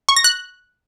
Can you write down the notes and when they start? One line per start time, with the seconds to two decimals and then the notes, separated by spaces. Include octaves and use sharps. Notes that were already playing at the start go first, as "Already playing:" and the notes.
0.09 C#6
0.16 A#6
0.24 F#6